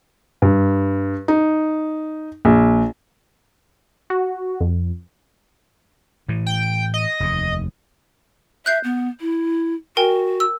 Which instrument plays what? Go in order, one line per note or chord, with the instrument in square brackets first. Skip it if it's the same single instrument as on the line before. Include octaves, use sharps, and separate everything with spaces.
[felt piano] G2
D#4
A#1
[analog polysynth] F#4
F2
[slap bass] A2 E3
[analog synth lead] G5
D#5
[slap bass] F1 D#2
[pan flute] E5 [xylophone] F#6 G6 C7
[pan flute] B3
E4
[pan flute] F#4 [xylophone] A#4 G5 G#5
[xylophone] E6